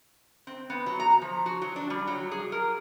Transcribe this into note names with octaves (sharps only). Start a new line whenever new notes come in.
C4
B3
F#3
A#5
F3
F#4
F#3
D4
G3
F#3
G#4
A#4